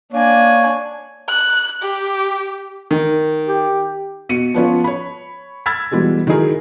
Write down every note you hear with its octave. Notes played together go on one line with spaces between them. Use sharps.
A#3 D4 C#5 G#5
F#6
G4
D#3
G4
B2 C#7 D#7
F3 B3 C#4 F4
C#5 B5
B5 E6 F6 G#6 A6 B6
B2 E3 G3 G#3
D#3 F#3 D#4 E4 G#4 A#4